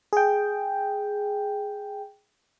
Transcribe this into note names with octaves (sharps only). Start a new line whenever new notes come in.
G#4 G5